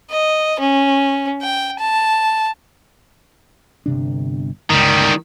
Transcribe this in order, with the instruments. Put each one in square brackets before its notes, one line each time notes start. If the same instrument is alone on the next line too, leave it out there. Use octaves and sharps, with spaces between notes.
[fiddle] D#5
C#4
G5
A5
[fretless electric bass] G1 C3 D4
[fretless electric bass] G1 C#2 [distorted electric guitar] D#3 G3